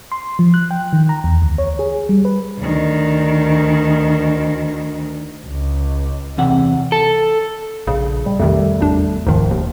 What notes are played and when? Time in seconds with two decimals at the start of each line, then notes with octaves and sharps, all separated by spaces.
0.12 C6
0.39 F3
0.54 F#6
0.71 G5
0.93 D#3
1.09 A#5
1.24 E2
1.42 D2
1.58 C#5
1.79 G#4
2.09 G3
2.25 B4
2.59 D2 D#3
5.46 C#2
6.38 E2 C3 F#5
6.92 A4
7.87 A#1 C#3
8.26 G3
8.40 F2 C3 D#3 G3 A3
8.81 G#1 E2 D4
9.27 D#1 C#2 G#2 D#3 F3
9.51 D#2